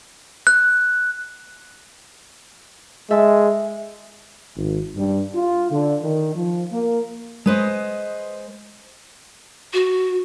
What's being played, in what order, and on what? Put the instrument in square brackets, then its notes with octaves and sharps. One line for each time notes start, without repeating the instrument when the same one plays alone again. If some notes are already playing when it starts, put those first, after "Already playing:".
[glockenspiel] F#6
[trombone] G#3 [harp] A4 E5
[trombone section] G#1
G2
F4
D3
D#3
F3
A#3
[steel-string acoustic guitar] G#3 B4 C5 D#5
[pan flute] F#4